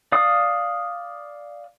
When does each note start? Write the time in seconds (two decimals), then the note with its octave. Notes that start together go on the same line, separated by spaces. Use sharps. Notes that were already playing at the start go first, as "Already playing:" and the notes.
0.12 D5 F5 D#6